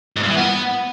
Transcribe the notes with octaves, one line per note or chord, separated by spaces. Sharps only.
G#2
G2
E3
B3